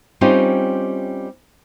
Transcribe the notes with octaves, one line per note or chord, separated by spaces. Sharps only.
G3 C4 C#4 D#4 F4 G4